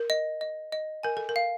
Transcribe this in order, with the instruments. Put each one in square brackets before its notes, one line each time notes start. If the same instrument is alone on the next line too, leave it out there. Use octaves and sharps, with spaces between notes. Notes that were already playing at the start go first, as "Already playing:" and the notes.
Already playing: [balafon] A#4
[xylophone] D#5
D#5
D#5
[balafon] A#4 [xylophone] G#5
[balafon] A4
A#4
[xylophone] F5